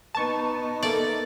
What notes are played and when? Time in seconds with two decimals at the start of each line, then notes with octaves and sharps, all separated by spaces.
0.15 B3 D#4 A5 C#6
0.83 A#3 A4 D5 E5